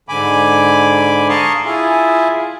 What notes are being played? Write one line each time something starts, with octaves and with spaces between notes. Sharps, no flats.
G#2 D3 G#5 B5 D6
F5 A5 A#5 C6 C#6 D#6
E4 F4 G#4 E5 G#5